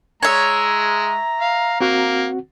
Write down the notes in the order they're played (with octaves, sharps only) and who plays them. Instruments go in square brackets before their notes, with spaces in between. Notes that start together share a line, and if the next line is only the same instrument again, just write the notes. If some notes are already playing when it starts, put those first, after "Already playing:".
[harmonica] G#3 [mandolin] C#5 E5 [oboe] A#5
[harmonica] F5
[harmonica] A#3 [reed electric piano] C4 F#4 F#5